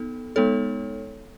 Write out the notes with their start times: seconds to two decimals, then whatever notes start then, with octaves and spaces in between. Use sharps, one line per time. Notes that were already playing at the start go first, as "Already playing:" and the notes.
Already playing: B3 D#4 A4
0.36 G#3 B3 D#4 A4 C#5